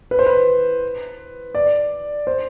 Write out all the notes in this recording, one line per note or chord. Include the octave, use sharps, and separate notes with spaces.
B4
C5
B4
D5
C5